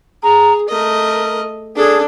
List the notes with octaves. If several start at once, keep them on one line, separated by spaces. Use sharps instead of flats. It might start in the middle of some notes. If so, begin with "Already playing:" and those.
G#4 A#5
A3 A#4 D#5
D4 G#4 A4